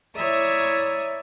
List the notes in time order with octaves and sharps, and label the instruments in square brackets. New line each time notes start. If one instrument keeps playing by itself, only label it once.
[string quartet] E4 C#5 D5 E5 A#5 D#6